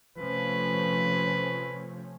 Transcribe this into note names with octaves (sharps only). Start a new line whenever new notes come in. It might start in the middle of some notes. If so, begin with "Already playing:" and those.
C3 F3 A3 C#4 B4